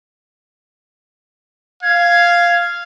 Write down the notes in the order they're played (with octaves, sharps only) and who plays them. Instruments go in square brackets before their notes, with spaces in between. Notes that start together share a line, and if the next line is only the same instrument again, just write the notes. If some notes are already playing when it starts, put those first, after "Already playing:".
[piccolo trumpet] F5 [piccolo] G#6